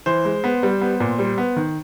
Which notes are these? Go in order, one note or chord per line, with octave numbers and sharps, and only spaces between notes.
E3 C5
G#3
B3
G3
B3
A#2
G3
B3
D#3